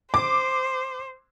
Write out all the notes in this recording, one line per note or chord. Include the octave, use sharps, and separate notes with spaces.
C5 D6